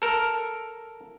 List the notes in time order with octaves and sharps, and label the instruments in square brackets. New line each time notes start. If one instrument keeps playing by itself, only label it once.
[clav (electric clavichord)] A4 A#4